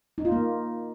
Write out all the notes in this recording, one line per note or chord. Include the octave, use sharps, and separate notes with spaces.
D#4
F4
A#3